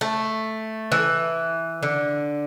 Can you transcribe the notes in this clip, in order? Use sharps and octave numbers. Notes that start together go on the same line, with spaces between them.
A3
E3
D3